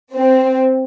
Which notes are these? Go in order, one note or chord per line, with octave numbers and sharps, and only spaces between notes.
C4